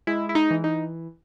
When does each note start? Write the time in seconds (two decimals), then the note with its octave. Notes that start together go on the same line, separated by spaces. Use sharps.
0.07 G#3 E4
0.29 E4
0.35 D#4
0.51 E3
0.64 D#4